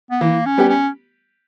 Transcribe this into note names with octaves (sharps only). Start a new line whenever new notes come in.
B3
E3 A#3
C#4
G3 B3 G4
C#4